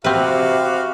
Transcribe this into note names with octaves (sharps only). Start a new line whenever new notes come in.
C3 C4 F#4 G4 B4 F5